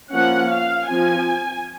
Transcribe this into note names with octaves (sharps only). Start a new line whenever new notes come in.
F3 A#3 C#4 F#5
F5
F3 C4 G#5